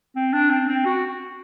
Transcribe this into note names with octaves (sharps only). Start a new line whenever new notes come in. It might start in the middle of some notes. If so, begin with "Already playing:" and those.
C4
D4
C4
C4
F#4